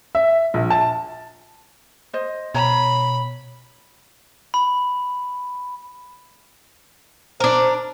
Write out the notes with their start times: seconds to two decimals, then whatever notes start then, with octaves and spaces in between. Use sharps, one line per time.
0.15 E5
0.54 A#1
0.70 A5
2.13 C5 D#5
2.54 B2 C#5 A#5 B5
4.54 B5
7.40 D4 A#4 C5